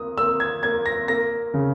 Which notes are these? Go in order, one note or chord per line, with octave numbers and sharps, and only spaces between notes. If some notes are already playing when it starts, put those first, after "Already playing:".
Already playing: A#3 D#6
A#3 E6
G#6
A#3 G#6
A#6
A#3 A#6
C#3